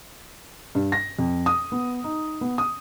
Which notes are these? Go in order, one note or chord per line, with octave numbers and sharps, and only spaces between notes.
G2
A#6
F2
D#6
B3
D#4
B3
D#6